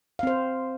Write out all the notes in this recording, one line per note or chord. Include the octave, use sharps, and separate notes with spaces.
C4 C5 F5